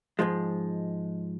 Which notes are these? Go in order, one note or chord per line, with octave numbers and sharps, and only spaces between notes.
G#2 F3 G#3